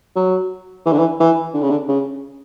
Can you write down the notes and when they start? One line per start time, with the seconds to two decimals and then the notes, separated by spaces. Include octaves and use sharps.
0.16 F#3
0.86 E3
0.92 D3
0.99 E3
1.20 E3
1.54 D3
1.62 C#3
1.70 D3
1.88 C#3